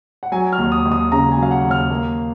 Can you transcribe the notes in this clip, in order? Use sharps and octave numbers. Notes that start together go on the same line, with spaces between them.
F#5
F#3 G#5
F6
D#2
D#6
D#2
D#6
C#3 A#5
G#5
F#3
F5
F#5
D#2
F6
A#3